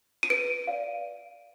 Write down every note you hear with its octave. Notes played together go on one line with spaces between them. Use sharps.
D#7
B4 D7
D5 F5